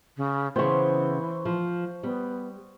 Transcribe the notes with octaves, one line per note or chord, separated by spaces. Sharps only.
C#3
C#3 E3 B3 C5 C#6
F3
G3 B3